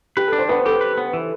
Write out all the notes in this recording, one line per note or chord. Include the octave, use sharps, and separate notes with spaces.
G4 B4
A4
D4
C5
B3 B4
G4 A4
B4
B3
E3